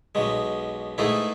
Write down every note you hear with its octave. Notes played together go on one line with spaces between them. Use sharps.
B1 B2 G#3
G#2 E3 A3 E4 G#4